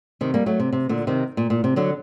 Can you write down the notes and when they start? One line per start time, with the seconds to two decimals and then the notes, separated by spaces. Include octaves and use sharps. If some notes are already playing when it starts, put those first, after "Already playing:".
0.21 C3 D#3
0.34 G3 A#3
0.46 F#3 A3
0.60 C3
0.73 C3
0.89 A#2 D3
1.07 C3 D#3
1.37 A#2
1.50 A#2
1.64 C3
1.76 D3 F#3